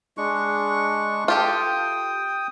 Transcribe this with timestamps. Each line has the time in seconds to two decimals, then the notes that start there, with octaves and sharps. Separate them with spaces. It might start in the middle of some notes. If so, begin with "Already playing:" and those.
0.17 G#3 D4 C#6
1.28 F4 G4 A4 G5 D#6